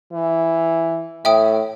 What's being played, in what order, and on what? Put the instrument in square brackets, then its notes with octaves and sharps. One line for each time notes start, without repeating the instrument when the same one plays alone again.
[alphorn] E3
[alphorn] A2 [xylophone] E5 G5 D#6